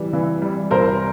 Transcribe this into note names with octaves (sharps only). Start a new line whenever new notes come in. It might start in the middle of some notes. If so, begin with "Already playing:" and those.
Already playing: E3 G3
E3
G3
C2 A#4 C5